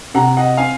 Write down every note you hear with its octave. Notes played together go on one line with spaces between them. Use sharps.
C3 F#5 A#5
D#5 F#5
C4 F5 G#5